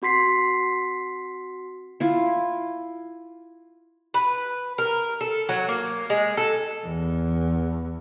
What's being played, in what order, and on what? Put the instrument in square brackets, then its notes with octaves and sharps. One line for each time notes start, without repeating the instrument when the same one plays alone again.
[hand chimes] C4 F#4 C6 B6 C7
[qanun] E4 F4
[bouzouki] B4
A#4
A4
F#3
A#3
G#3
A4
[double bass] E2